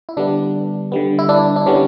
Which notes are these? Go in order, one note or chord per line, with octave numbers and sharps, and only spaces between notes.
E4
D3 G3 B3 D4
D3 G3 B3
E4
D4
D4
D3 G3 B3 C#4